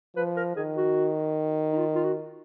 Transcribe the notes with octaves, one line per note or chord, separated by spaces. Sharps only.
F3 B4
A#4
D#3 G#4
F#4
D#4
F4
F4
F#4